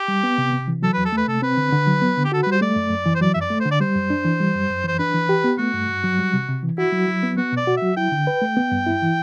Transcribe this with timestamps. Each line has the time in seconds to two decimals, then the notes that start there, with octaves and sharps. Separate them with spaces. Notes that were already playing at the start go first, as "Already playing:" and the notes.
Already playing: G4
0.08 G3
0.24 B3
0.38 C3
0.53 C3
0.68 E3
0.83 F#3 A4
0.93 E2 B4
1.05 A4
1.12 A3 B4
1.27 C3 A4
1.42 C4 B4
1.57 D3
1.72 D3
1.87 F#3
2.02 B3
2.17 D3
2.25 G4
2.32 F#4 A4
2.43 G3 B4
2.52 C5
2.61 A3 D5
2.76 F#2
2.91 F#2
3.06 E3
3.15 C5
3.21 F#3 D5
3.34 F#2 E5
3.41 D5
3.50 A3
3.60 C5
3.66 D3
3.71 D5
3.80 G3 C5
3.95 F#2
4.10 D4
4.25 E3
4.40 G3
4.55 F#2
4.70 F#2
4.84 E3 C5
4.99 D4 B4
5.14 E3
5.29 G4
5.44 B3
5.58 A3 F#4
5.74 G2
5.89 G2
6.04 F#3
6.19 G3
6.33 C3
6.49 C3
6.63 E3
6.78 E4 F#4
6.93 F#3
7.08 F#3
7.23 B3
7.37 B3 F#4
7.52 B2 D5
7.67 F#4
7.77 E5
7.82 F#3
7.97 E4 G5
8.12 D3
8.27 B4
8.42 A3
8.57 B3
8.72 G2
8.87 E4
9.02 E3